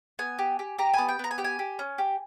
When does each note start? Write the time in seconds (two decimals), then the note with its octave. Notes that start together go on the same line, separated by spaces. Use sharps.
0.19 B3 G#5
0.39 G4
0.59 G4
0.78 G4 A#5
0.94 B3 G#5
1.08 G5
1.19 B3 A#5
1.31 G#5
1.38 G4 G5
1.44 G#5
1.59 G4
1.79 C#4
1.98 G4